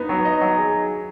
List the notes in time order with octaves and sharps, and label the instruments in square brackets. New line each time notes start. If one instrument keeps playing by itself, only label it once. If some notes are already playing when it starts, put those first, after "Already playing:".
Already playing: [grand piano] B3 [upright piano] D#4
[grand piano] F#3
D#5
F#3
G#4